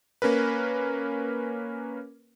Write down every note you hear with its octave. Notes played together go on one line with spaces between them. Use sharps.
A#3 C#4 A#4 B4